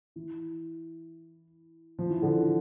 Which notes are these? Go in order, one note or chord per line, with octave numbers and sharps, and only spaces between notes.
E3
F3
E3
D3 F3